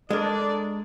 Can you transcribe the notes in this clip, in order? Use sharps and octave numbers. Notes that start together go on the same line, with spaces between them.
G#3 D4 A4 A#4 D5